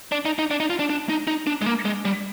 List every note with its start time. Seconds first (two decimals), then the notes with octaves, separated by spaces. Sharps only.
0.12 D4
0.25 D#4
0.39 D#4
0.51 D4
0.60 D#4
0.70 F4
0.79 D4
0.90 D4
1.09 D#4
1.27 D#4
1.47 D4
1.62 G#3
1.66 A#3
1.85 G#3
2.05 G3